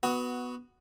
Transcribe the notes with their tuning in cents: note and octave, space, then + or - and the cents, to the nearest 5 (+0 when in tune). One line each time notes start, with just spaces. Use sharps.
B3 +0 F#4 +0 D#6 +40